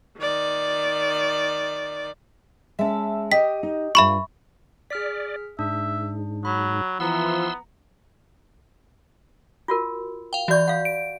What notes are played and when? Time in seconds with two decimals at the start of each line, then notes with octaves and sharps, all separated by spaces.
0.19 D#3 D5
2.79 G#3 C#4 E5 A5
3.32 G4 D#5 G5 B6
3.63 D#4
3.95 G2 G3 F4 E5 B5 C#6
4.90 G#4 D5 F6 B6
5.59 G#2 D4 E5
6.45 F#3 B5
7.00 E3 F3 B3 F#5 A#5 C6 E6
9.68 F4 F#4 A#4
10.33 F5 G5
10.48 E3 F#4 D5 C#6 G6
10.68 F5 F#5
10.85 D7